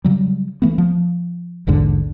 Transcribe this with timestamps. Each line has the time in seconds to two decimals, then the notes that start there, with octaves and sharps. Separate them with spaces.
0.04 C#3 F#3 G3
0.62 E3 A3 B3
0.78 F3
1.67 A#1 E2 G#2 D3